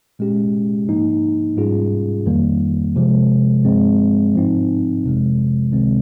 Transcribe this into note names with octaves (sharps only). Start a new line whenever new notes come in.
A#2 G#3 C#4 G4
G#2 F3 A#3 D#4
G#2 G3 C#4 F4 G#4
F2 D#3 G3 A#3
C3 F3 G#3
G2 F3 G#3 C4
G#2 F3 C4 D#4
G1 F2 C3 F3 G#3
C#2 C3 D#3 G#3 C4